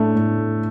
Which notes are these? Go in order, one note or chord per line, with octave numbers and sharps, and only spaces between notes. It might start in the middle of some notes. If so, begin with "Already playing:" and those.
Already playing: A2 A3 D4
A2